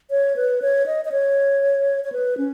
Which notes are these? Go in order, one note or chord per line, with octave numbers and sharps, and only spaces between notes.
C#5
B4
C#5
D#5
D#5
C#5
C#5
B4
C#4